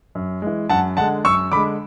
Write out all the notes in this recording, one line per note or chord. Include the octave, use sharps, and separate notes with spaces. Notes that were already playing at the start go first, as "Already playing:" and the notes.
F#2
E3 G#3
F#2 F#5 A5
D3 G#3 F#5 A5
F#2 C#6 E6
D3 G#3 B5 D6